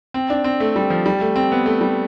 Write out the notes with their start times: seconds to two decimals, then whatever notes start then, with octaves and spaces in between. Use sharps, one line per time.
0.14 C4
0.30 D4
0.44 C4
0.60 A3
0.76 G3
0.90 F3
1.06 G3
1.21 A3
1.36 C4
1.52 B3
1.66 A3
1.81 G3